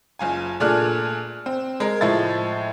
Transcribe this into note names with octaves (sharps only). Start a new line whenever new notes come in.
F#1 F4 G#5
A#2 A3 D4 G#4 F6 F#6
C4
G#3 A#4
A2 F3 G#3 E5 A6